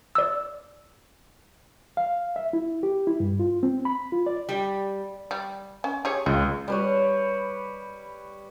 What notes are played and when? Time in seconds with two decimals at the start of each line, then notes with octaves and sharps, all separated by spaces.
0.15 D5 E6
1.97 F5
2.36 E5
2.53 E4
2.83 G4
3.07 E4
3.20 G2
3.40 F4
3.63 C4
3.85 B5
4.12 F4
4.26 D5
4.49 G3
5.31 G3
5.84 C#4
6.05 G4 G#4 C#5
6.26 C#2 F4
6.68 G3 B4 C#5